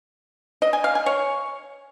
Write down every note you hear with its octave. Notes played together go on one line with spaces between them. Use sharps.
D#5
G#5
F5
G#5
C#5